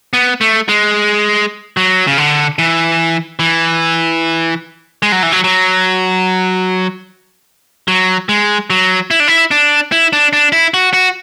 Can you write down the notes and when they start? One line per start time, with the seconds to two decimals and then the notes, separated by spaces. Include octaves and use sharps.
0.13 B3
0.41 A3
0.69 G#3
1.77 F#3
2.07 C#3
2.18 D3
2.59 E3
3.39 E3
5.03 G#3
5.12 F#3
5.23 E3
5.32 F#3
5.44 F#3
7.88 F#3
8.29 G#3
8.70 F#3
9.11 E4
9.20 D4
9.28 E4
9.51 D4
9.92 E4
10.13 D4
10.33 D4
10.52 E4
10.74 F#4
10.93 F#4